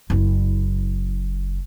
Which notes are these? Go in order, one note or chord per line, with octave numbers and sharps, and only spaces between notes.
F#1 E4